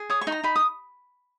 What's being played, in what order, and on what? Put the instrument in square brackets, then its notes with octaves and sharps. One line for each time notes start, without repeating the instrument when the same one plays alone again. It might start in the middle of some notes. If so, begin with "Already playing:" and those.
Already playing: [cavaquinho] G#4
C#5 D#6
C#6
D#4
A#5
D#4 B5
D#6